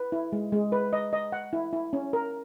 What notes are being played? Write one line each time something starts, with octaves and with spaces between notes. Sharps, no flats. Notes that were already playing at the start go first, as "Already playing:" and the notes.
Already playing: B4
E4
G#3
G#3
B4
D#5
D#5
F#5
E4
E4
C#4
A#4